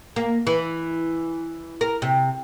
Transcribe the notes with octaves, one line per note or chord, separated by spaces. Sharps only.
A#3
E3
A#4
C3